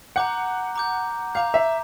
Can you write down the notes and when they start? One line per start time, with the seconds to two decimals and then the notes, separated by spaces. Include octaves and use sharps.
0.16 F#5 A#5 D6 G6
0.76 A#5 D6 G6
1.35 F5 A#5 D6 G6
1.54 E5